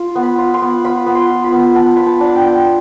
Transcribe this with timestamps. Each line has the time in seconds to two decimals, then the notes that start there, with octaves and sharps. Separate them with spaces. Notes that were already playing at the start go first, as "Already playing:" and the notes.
Already playing: F4
0.16 B3
0.23 B5
0.38 F4
0.54 C6
0.62 B3
0.85 F4 B5
1.06 B3
1.15 C6
1.30 F4
1.44 B5
1.52 B3
1.75 B3 A5
1.97 F4 B5
2.06 A5
2.21 D4
2.35 G5
2.44 B3